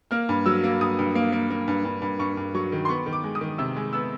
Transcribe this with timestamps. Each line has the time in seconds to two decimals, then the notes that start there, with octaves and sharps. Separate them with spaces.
0.11 A#3 F6
0.29 G2
0.46 F#3 E6
0.64 A#3
0.81 G2 D#6
0.99 G2
1.15 A#3
1.32 A#3
1.50 A#3
1.68 G2
1.85 G2
2.02 G2
2.19 G2 C#6
2.37 G2
2.54 F#3 C#6
2.72 D#3
2.85 C6
2.89 B3 C#6
3.06 D#3
3.13 D6
3.24 G#3
3.35 D#6
3.41 D#3
3.58 C3 E6
3.76 G#3
3.93 B3 E6